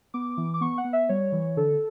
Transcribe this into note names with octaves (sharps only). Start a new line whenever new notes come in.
B3 D6
E3
D6
B3 C#6
F#5
B3
E5
G3 C#5
E3
D3 A4